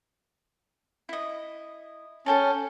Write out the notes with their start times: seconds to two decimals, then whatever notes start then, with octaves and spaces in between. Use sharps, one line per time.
1.09 E4 D#5
2.26 C#4 A4 G5 A5